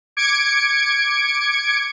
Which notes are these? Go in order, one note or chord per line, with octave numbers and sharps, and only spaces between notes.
D6 G#6 C#7 D7